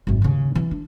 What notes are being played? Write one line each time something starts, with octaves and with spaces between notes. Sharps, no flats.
G#1 F#2
D#2 C#3
E3 C4
D4